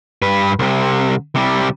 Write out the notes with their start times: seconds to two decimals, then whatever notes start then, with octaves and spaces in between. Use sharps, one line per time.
0.22 G2 B4
0.59 C2 C3
1.35 C3 G3